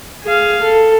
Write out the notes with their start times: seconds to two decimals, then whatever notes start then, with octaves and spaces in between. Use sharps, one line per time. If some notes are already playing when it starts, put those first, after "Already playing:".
0.24 G#4 F5
0.63 A4